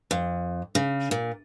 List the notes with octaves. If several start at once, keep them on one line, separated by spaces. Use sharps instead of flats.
F2
C#3
A#2